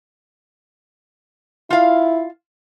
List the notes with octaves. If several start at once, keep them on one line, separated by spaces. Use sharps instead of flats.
E4 F4 F5